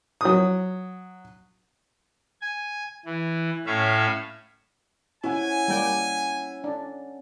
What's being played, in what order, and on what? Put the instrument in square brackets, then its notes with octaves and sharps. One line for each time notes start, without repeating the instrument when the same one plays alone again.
[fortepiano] F#3 D#6
[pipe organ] G#5
E3
A2 C#4 E5 F5
[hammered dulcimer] C#4 F#5 [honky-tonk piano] E4 [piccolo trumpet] G#5
[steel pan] G3 A#3 G5
D4